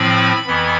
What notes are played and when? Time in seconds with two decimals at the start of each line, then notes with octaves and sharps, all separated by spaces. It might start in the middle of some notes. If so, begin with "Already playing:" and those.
Already playing: A2 F3 C4 B5
0.47 F2 E3 B3